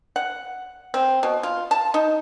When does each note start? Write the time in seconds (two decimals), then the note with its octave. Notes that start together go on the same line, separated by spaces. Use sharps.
0.16 F#5
0.94 C4
1.23 B2
1.43 F4
1.71 A5
1.94 D#4